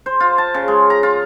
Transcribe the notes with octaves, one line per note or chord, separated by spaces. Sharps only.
C5
F4
A5
C#3
G#3
A#5
F4